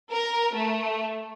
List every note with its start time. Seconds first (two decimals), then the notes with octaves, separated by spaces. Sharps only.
0.11 A#4
0.55 A3